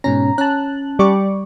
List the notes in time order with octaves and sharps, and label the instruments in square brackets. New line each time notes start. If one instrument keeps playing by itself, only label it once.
[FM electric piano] G#2 B2 C#4 [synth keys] A#5
[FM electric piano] C#4 A5 [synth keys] F#6
[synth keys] G3 D5 C#6